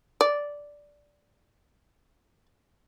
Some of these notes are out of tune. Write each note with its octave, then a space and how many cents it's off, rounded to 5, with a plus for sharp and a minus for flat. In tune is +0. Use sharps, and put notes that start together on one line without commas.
D5 -5